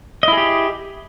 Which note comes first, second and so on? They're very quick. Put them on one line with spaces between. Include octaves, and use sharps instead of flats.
D#5 E4 G#4 G4